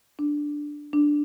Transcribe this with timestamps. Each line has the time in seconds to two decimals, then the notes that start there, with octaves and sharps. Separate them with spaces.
0.19 D4
0.93 D4